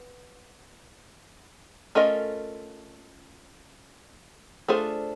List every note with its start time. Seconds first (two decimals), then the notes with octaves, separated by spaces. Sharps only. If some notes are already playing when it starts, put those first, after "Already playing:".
Already playing: B3
1.95 A3 C#4 F4 A#4 D#5
4.68 A3 D4 F4 G#4 C5